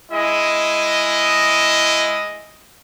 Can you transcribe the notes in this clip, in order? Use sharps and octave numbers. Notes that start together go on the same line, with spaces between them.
G#3 E4 D#5